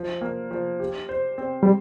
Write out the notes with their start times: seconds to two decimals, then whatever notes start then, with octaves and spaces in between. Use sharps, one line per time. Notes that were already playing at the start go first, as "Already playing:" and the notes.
Already playing: F3
0.21 A#3
0.51 F3
0.80 G4
1.09 C5
1.38 C4
1.63 G3